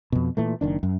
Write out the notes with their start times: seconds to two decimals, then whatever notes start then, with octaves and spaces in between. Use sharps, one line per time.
0.12 F2 B2
0.37 A#2 E3 A3
0.61 F#1 D#3 D4
0.83 F#2